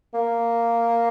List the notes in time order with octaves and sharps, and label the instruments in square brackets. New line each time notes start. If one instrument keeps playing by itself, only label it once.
[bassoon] A#3